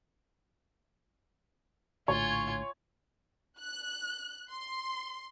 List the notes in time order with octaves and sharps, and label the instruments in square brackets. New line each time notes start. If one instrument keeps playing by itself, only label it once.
[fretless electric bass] A#1 A2 D3 [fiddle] F4 G#5 [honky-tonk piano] C#5
[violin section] F#6
C6